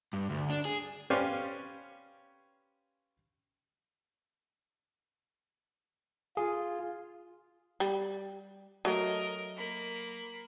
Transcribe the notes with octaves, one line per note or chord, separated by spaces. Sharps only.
G2
D2
D4
G#4
C#4 G4 B4 C5 D5 F5
F4 G#4
G3
F#3 A3 A#4 D#5
A#3 B5